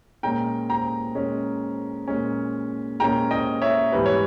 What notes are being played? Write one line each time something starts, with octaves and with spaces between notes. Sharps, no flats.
A#2 G#3 C#4 G5 A#5
G5 A#5
A#2 G#3 C#4
A#2 G#3 C#4
A#2 G#3 C#4 G5 A#5
D#5 G5
C#5 E5
G#2 E3 G3 B4
C#5